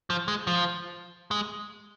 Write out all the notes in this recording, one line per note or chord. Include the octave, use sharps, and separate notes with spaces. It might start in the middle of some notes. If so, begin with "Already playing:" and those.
F3
G#3
F3
G#3